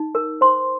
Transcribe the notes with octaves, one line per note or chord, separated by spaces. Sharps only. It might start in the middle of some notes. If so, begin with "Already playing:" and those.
Already playing: D#4
A#4
C5 C6